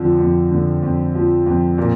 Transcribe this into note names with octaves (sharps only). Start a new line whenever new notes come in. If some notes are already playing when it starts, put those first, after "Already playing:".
Already playing: F2 D3 F3
F2
D3
F2
F3
F2
A#2